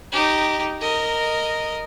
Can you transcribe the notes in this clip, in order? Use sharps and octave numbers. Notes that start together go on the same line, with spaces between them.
D#4 G4
A#4 D#5